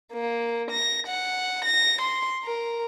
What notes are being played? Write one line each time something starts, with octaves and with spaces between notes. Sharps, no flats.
A#3
A#6
F#5
A#6
C6
A#4